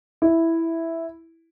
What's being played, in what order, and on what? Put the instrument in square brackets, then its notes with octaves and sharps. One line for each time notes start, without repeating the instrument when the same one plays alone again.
[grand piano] E4